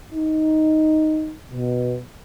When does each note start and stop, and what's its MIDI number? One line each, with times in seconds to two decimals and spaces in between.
0.13 1.33 63
1.51 1.97 47